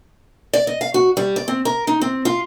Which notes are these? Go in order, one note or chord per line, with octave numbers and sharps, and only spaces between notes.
D5
D#5
F5
F#4
G3
D5
C4
A#4
D#4
C4
F4